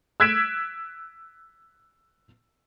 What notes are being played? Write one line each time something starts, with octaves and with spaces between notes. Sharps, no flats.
E6 F#6 G#6 B6 D7 E7